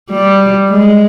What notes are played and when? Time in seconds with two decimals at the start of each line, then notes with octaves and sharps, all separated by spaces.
0.10 G3
0.70 G#3